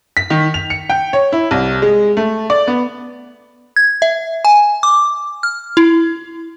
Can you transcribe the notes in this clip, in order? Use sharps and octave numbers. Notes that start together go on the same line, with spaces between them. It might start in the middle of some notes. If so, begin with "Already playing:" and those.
B6
D#3
F7
C#7
G5
C#5
E4
C2
G#3
A3
D5
B3
G#6
E5
G#5
D6
F6
E4